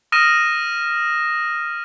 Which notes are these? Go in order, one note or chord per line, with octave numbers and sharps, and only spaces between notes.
D#6 F6 A#6 D#7 E7